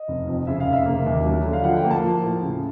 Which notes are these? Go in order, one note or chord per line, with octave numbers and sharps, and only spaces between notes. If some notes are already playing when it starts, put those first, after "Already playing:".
Already playing: D#5
F1
F2
C#3 E5
F5
F1
E5
A#3
D#2
F#3
D3
F5
F3 F#5
G5
A#3
A5
F3
A2
C#3